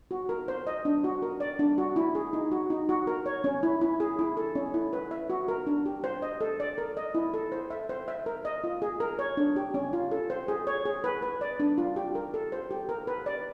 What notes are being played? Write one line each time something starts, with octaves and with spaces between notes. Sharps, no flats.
F#4
A#4
C5
D#5
D4
F#4
A#4
D5
D4
F#4
E4
G#4
D#4
F#4
D#4
F#4
A#4
C#5
C#4
E4
E4
G#4
E4
A4
C#4
E4
B4
E5
F#4
A#4
D4
G4
C5
D#5
A4
D5
A#4
D#5
E4
A4
C5
E5
C5
E5
A#4
D#5
F4
G#4
A#4
C#5
D4
G4
C#4
F4
A4
C5
G#4
C#5
G#4
B4
B4
D5
D4
F4
G4
A#4
A4
C5
G4
A#4
B4
D5